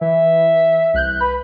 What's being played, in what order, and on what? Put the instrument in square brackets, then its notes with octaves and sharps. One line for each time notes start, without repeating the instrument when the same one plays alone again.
[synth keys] E3 [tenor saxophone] E5
[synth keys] C2 F#6 G6
[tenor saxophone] B4 [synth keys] B5